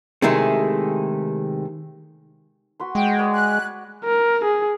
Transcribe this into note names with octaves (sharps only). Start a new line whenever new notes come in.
C3 D#3 G#3 A3 E4 G#4
F#4 B4 C6
G#3 G5
B4 C#5 D5
F#6
A#4
G#4